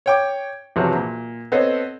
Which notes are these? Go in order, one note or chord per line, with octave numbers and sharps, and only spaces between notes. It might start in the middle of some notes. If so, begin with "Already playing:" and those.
C#5 G5 D6
B1 E2 C3 F3 F#3
A#2
B3 C4 A4 C5 C#5 D#5